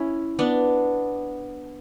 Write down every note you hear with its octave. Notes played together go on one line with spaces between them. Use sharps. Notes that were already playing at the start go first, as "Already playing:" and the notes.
Already playing: C#4 E4
B3 D4